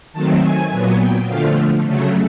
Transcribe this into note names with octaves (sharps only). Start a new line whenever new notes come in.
D#3 F#3 A3 C4 A5
G#5
A#2 F#3 B3
G5
D3 F3 A3 F5
C#3 F#3 A3